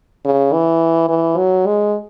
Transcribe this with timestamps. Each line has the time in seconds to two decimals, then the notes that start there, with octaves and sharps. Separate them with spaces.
0.25 C#3
0.53 E3
1.09 E3
1.37 F#3
1.66 G#3